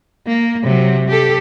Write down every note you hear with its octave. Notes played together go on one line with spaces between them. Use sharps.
A#3
C3 F#3
G4 A4